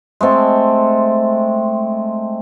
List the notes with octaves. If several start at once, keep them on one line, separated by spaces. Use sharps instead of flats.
G#3 A3 C4 A4